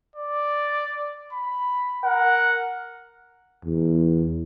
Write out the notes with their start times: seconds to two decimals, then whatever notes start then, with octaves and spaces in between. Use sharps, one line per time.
0.16 D5
1.33 B5
2.05 A#4 F#5
3.65 E2